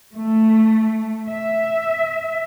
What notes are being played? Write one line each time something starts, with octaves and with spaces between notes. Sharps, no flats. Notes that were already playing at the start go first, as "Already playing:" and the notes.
A3
E5